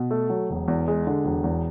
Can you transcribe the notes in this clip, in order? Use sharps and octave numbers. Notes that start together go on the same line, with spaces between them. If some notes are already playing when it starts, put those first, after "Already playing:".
Already playing: B2
A3
F#3
E1
E2
G#3
D3
E1
E2